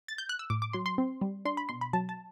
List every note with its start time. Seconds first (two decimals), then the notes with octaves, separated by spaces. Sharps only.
0.08 A6
0.18 G6
0.29 F#6
0.39 E6
0.50 A2 D6
0.62 D6
0.73 F#3 C6
0.86 C6
0.98 C4
1.21 G3
1.45 D4 C6
1.57 B5
1.69 B2 C6
1.81 B5
1.93 F#3 A5
2.09 A5